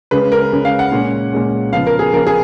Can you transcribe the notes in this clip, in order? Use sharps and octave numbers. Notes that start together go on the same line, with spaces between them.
C#3 G#3 C#4 B4
A#4
C#3 G#3 C#4
F5
F#5
A#2 G#3 C#4
A#2 G#3 C#4
C#3 F3 B3 F5
A#4
G#4
C#3 F3 B3 A#4
G#4